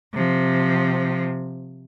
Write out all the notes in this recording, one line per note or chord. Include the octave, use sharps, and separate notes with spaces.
C3 F3